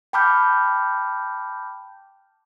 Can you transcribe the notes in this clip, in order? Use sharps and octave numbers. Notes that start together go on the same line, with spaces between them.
G5 A5 B5 D6 F6 G6